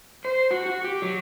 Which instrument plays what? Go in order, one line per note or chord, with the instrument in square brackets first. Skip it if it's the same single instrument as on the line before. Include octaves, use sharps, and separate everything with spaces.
[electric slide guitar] C5
F#4
F#4
G4
F#3